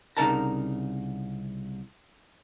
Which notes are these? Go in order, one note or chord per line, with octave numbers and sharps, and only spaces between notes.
C2 C#3 D#4 A#4 A5 A#5